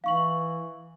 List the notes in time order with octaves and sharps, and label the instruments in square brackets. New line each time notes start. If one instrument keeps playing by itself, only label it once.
[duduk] E3 [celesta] F5 C#6 F#7